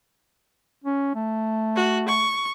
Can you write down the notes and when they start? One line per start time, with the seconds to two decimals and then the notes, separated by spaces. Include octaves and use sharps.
0.84 C#4
1.15 A3
1.76 F#4
2.08 C#6